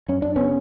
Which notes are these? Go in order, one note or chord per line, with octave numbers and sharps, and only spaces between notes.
F#2 C#4
F#2 D4
C#3 B3 C#4